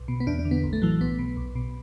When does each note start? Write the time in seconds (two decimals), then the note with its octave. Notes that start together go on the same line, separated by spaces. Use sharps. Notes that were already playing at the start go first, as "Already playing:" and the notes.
Already playing: B1
0.08 B2
0.20 B3
0.27 E2 D4
0.39 D4
0.45 D3
0.51 B3
0.64 A1
0.73 A3
0.82 A2 E3 F#3
1.01 B1 B3
1.19 B2
1.37 B1
1.55 B2